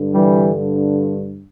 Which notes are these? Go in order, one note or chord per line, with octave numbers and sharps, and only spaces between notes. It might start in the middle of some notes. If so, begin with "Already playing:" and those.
Already playing: G2 D3
E3 G3